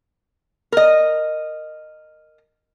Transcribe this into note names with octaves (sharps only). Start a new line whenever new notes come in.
A#4 D#5